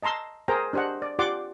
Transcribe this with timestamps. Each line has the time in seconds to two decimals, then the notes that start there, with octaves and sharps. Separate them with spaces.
0.03 D#5 A5 A#5 C6 E6
0.48 G#4 A#4 C5 G5 A#5
0.73 D4 G4 C5 D#5 F#5
1.02 D5
1.19 F4 G4 D5 F#5 C6 D6